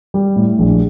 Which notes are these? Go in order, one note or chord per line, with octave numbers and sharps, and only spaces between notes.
G3
A2
A#1